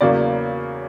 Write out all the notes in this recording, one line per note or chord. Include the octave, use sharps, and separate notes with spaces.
E2 C#3 F#3 A#3 D5